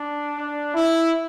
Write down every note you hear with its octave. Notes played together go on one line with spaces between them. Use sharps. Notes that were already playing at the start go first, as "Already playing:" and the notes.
Already playing: D4
D4
E4